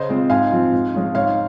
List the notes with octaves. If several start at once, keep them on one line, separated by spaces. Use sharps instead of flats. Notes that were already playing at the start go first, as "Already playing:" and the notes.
Already playing: C#3 C5 D#5
G#3 C4 F4
G#2 F5 G#5
F3 C4 F4
G#2
F3 G#3 C#4 F4
G#2 C#5 F5